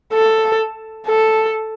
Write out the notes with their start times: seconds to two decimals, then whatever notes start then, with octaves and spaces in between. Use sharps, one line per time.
0.14 A4
1.07 A4